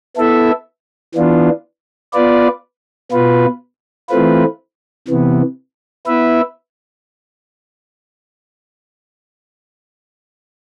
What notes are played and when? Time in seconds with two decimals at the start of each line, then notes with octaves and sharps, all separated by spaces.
0.17 B3 E4 A4 E5
1.15 E3 B3 D4 F4
2.13 B3 F4 B4 D5
3.12 B2 B3 F4 B4
4.10 E3 A3 C4 F4 B4
5.08 C3 E3 B3
6.07 B3 E4 B4 E5